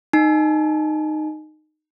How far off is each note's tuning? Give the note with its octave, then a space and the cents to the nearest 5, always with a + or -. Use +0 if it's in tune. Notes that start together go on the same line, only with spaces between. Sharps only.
D#4 -15 G#5 +25